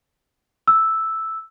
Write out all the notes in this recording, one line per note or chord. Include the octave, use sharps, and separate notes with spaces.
E6